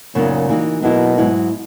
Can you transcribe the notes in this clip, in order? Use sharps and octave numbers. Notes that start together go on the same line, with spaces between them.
F#2 A#2 C#3 F#3 B3 D#4
E3 A#3 D#4 F#4
B2 F#3 A#3 E4 A#4
G#2 F#3 B3 E4